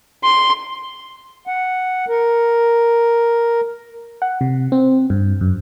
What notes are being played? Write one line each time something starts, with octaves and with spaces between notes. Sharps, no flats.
C6
F#5
A#4
F#5
C3
C4
G2
F#2